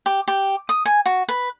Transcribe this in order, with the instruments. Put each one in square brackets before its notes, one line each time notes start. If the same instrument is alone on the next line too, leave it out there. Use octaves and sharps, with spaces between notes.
[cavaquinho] G4
G4
D#6
G#5
F#4
B4